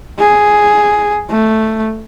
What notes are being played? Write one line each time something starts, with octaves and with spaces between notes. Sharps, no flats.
G#4
A3